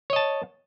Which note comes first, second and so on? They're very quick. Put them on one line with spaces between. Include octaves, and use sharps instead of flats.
C#5 D#5 A5